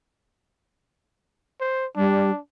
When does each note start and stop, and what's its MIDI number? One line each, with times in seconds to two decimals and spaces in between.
1.61 1.86 72
1.96 2.30 55
1.96 2.38 62